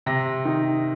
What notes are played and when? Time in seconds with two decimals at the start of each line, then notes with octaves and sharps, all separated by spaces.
0.06 C3 A#6
0.45 D#3